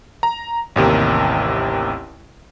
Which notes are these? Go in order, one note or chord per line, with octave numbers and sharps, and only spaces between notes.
A#5
A1 D#2 C3 A#4